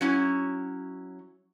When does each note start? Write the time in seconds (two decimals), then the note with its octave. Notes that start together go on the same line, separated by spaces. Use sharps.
0.01 F#3 C#4 E4